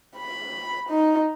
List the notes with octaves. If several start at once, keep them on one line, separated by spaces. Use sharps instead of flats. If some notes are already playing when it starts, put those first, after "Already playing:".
B5
D#4